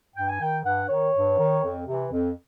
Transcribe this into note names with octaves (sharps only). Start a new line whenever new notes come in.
G2 G5
G#5
D#3 G5
G2 F#5
D#3 C#5
G2
D#3
F2
C3 E3
F2